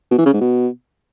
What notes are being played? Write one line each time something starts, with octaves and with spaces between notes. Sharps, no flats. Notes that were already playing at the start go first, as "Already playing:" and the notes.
B2
E3
C#3
G#2
B2